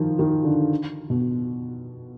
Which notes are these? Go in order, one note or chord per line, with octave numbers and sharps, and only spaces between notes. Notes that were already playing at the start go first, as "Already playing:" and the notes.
Already playing: D#3 F3
D#3
D3
B2